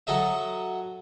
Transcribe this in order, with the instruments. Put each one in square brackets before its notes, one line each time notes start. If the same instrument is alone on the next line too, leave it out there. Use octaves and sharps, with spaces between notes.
[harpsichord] F#3 A4 D#5 E5